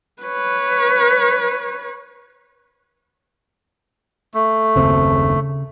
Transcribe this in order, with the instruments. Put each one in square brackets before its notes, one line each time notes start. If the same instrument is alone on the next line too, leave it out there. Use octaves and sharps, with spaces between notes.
[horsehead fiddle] B4 C#5
[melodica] A3
[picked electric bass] F#1 D#2 C4 [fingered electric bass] C#3